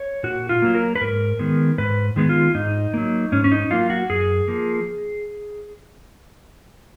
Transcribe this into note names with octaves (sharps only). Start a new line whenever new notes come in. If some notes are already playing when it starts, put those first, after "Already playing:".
Already playing: C#5
A#2 F#4
F4
F#3 A#3
A#4
B4
G#2 A#4
D#3 G#3 B3
G#2 B4
D#3 G#3 B3
F4
G#2 D#4
F#3 A#3
G#2 C#4
C#4
D#4
F#3 A#3 F4
F#4
F#2 G#4
F3 A#3